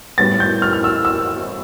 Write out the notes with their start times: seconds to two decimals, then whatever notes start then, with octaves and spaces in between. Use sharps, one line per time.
0.18 A2 G3 B3 A6
0.40 G6
0.62 F6
0.73 F6
0.84 E6
1.05 E6